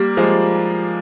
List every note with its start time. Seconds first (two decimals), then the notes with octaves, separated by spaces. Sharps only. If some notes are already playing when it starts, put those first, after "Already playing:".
Already playing: G3 A#3 G4
0.17 F3 G#3 C#5
0.52 D#4